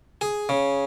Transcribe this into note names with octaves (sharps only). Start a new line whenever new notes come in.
G#4
C#3